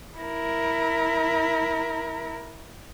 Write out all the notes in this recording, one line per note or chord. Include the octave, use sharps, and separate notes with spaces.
E4 A#4